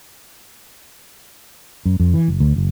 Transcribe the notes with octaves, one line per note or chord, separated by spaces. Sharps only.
F#2
F2
E3
F#1
D2
F#1